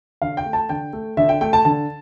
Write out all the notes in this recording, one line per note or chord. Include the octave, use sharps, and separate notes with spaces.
D3 F5
G5
A3
A5
D3 G5
A3
D3 E5
G5
A3 G5
A5
D3 A5